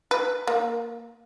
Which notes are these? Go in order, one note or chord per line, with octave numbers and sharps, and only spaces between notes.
B4
A#3